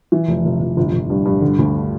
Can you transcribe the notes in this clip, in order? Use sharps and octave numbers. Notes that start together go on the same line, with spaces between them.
E3
F1
F1
F1
G1
G1
G2
G2
D3
D2